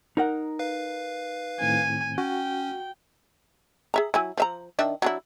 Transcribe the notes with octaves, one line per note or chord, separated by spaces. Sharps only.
D#4 A#4 F#5
B4 F5
A2 D#3 C4 G#5
C#4 F#4 G5
G#4 E5 A#5
F#3 E4 G#5
F3 E5 A#5
D#3 D4 E5
F#3 D4 E4